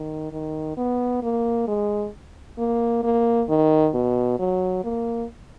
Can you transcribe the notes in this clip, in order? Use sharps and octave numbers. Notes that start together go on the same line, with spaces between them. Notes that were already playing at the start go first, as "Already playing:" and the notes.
Already playing: D#3
D#3
B3
A#3
G#3
A#3
A#3
D#3
B2
F#3
A#3